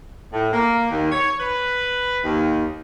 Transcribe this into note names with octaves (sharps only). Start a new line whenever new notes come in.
A2
A#3
D#2
C#5
B4
D#2